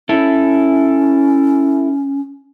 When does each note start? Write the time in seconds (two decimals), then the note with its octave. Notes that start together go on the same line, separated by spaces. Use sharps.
0.09 C#4 E4 A4